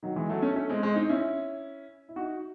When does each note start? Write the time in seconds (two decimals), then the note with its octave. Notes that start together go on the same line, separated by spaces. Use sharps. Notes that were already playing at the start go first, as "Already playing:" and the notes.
0.03 D#3 F#3
0.16 E3 G#3
0.30 F#3 A3
0.42 A3 C#4
0.56 A3 C#4
0.69 G#3 C4
0.83 G#3 C4
0.96 C4 D#4
1.09 C#4 E4
2.09 E4
2.16 D#4 F#4